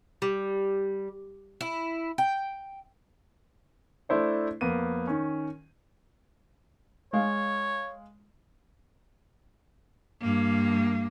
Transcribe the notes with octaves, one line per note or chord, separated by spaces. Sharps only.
G3
E4
G5
A3 D4 E4 C5 D5
F2 A#3 B3 D#7
D#3 C#4
G#3 C#5 F5
G2 A#3